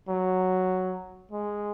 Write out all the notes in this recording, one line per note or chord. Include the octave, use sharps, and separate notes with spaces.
F#3
G#3